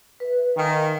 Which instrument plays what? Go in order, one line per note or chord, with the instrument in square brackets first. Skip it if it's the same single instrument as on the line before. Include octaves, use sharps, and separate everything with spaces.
[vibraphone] B4 E5
[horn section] D#3 [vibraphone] E5 F5 G#5